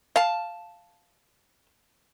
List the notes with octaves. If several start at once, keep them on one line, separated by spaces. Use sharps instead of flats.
F5 A5